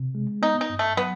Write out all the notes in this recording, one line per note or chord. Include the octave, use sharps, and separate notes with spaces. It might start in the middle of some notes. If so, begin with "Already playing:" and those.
Already playing: C3
G#3
B3 D#4
D#4
G2
A3
F#3 B3